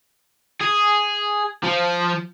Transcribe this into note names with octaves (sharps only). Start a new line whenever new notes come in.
G#4
F3